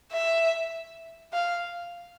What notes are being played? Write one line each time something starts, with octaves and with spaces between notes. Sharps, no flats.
E5
F5